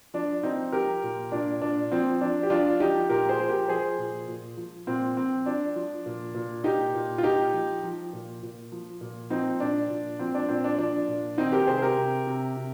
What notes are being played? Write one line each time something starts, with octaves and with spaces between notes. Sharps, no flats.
F3 D4
F3 C4 D#4
F3 G4 A#4
A#2
A#2 D4
A#2 D4
F3 C4
F3 D4
G4
F3 D4 F4
F3 D#4 G4
A#2 G4 A#4
G#4 C5
F3
G4 A#4
F3 G#4 C5
A#2
A#2
F3
A#2 C4
F3 C4
F3 D4
F3
A#2
A#2
A#2 D#4 G4
A#2
F4
A#2 D#4 G4
F3
F3
A#2
A#2
F3
A#2
F3 C4 D#4
A#2 D4
A#2
F3 C4
D4
A#2 C4
D4
F3 D4
A#2
D#3 C4 D#4
G4 A#4
C3 G#4 C5
G4 A#4
C3
C3
C3